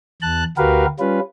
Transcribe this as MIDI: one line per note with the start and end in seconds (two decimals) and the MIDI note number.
0.22 0.44 40
0.22 0.44 81
0.22 0.44 90
0.57 0.86 38
0.57 0.86 66
0.57 0.86 67
0.57 0.86 70
0.57 0.86 71
0.57 0.86 77
0.99 1.20 55
0.99 1.20 61
0.99 1.20 65
0.99 1.20 71